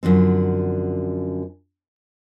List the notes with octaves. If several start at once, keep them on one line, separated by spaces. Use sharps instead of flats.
F#2 D3 F3 C4